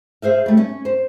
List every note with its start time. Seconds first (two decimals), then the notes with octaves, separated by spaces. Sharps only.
0.22 G#4 C5 E5 F5
0.46 G3 A3
0.57 C#4
0.85 C5